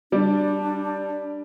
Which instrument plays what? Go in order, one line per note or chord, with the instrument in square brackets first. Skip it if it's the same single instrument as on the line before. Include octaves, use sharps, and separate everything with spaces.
[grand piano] G3 D5 [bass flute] D4